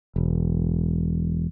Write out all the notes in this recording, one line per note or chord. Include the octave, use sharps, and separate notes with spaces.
E1